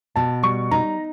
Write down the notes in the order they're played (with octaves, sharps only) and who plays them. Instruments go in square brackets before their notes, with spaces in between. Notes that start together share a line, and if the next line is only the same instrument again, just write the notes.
[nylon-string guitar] B2 [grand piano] A5
[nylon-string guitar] G3 [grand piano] C#6
[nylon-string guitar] D#4 [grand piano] A#5